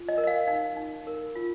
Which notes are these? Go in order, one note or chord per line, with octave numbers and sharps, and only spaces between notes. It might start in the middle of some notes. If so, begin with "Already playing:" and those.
Already playing: F4
D#5
A#4
D#5
F5
D#4 F5
D#4
A#4
F4